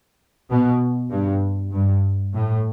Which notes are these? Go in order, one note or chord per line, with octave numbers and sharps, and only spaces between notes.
B2
G2
G2
A2